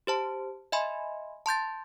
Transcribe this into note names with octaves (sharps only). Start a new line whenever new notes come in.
G4 C5 A5
D#5 E5 G#5 B5 C6
A5 C6 G6 A6